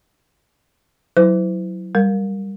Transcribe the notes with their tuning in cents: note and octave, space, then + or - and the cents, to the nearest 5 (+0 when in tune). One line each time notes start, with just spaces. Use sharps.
F#3 +0 E4 +0 C5 -45
G3 +10 A#4 +0